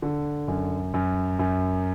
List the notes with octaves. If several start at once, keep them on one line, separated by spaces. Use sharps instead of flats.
D3
F#2
F#2
F#2